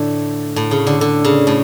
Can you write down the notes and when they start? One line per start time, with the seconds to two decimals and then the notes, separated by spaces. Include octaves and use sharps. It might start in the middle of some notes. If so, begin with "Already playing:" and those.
Already playing: A2 D3
0.56 A2
0.71 C#3
0.87 D3
1.01 D3
1.25 C#3
1.47 A2